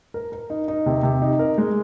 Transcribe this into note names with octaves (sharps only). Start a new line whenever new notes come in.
A#4
A#4
D#4
D#4
C3
C3
D#4
A#4
G#3